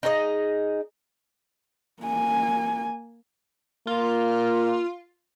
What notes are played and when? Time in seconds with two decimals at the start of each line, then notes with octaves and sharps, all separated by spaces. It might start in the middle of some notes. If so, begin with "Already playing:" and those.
0.03 D#4 G#4 C#5 D#5
2.03 A#3 G#5
3.87 A#3 F4